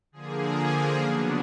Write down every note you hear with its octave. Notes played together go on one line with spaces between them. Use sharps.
D3 F3 A#3 G#4
C#3 F#3 B3 D4